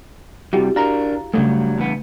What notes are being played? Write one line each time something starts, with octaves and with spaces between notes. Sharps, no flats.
C3 G3 E4 F#4 G4
D4 A#4 F5 A#5
G2 C#3 F#3 G3 A3
E2 G2 B3